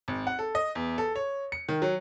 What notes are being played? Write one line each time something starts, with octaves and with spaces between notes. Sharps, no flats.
G#1
F#5
A4
D#5
E2
A4
C#5
C#7
D#3
F#3